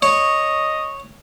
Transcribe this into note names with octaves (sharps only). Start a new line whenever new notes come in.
C#5 D#5